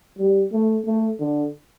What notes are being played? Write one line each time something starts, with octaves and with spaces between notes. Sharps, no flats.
G3
A3
A3
D3